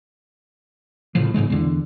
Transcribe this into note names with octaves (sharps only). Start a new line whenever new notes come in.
A1 A2 C#3 F3
B1 G#2 C#3 G#3
E2 D3